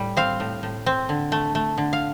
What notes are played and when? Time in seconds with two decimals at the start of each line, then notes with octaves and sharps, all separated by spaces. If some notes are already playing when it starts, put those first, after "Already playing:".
Already playing: A2 G3
0.17 C4 F5
0.40 A2
0.63 A2
0.86 C4
1.09 D3
1.32 A3
1.55 A3
1.78 D3
1.93 F5